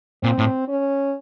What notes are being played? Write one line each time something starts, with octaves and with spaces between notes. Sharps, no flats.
A#2 C4
A2
C#4